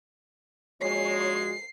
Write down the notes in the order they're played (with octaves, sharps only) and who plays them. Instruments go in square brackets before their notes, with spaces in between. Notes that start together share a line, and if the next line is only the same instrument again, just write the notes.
[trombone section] A#1 A#2 G#3 [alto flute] F#4 [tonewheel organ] C#5 [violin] C7